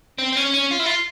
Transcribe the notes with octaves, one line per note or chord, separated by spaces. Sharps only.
C4
C4
C#4
C#4
F4
E4
F4